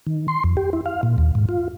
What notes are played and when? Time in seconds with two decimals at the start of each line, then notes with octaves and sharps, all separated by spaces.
0.07 D#3
0.28 C6
0.44 F2
0.57 G4
0.73 E4
0.86 F5
1.03 A#2
1.18 D#2
1.35 G#2
1.49 F4